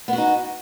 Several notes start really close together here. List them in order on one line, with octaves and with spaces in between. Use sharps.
B3 F#4 D#4